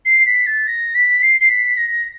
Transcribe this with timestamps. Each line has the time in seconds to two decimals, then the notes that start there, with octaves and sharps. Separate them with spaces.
0.05 C7
0.25 B6
0.46 A6
0.67 A#6
0.94 B6
1.22 C7
1.40 C7
1.49 B6
1.77 A#6